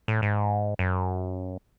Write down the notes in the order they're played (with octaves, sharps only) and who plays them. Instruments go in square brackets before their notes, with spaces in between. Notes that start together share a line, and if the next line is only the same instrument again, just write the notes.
[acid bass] A2
G#2
F#2